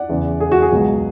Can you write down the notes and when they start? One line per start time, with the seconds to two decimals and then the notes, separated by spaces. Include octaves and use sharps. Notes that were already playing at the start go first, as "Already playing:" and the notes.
Already playing: D5 F#5
0.09 E2 C#3 E3
0.40 G#4
0.52 F#4
0.62 G#4
0.72 C#2 B2 F#3